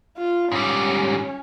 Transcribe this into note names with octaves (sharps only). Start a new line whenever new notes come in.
F4
G#2 G3 C#4